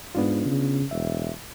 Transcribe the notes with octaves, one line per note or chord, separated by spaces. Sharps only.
G#2 B3 D4 F4
C#3
E1 E5